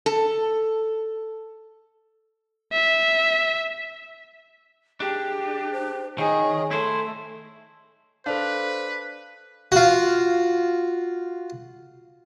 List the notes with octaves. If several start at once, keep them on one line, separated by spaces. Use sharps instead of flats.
A4
E5
D4 G4 G#4
C5
D#3 G#4 C#5 D#5
A3 E4 A4 C5
D4 A4 B4 C5 F5
F4 F#4